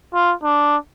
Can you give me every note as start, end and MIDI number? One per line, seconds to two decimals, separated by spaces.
0.14 0.34 65
0.44 0.77 62